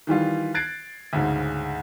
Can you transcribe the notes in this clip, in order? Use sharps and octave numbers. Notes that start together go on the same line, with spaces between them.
D#3 E3 G3 F4
F#6 G#6 A6 C7 D7
D2 G#2 C#3